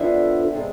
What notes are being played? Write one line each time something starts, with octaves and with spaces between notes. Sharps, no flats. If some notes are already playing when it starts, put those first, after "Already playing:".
Already playing: F2 D3 F3 B3 D4 E5
C3 G#3 B3 D4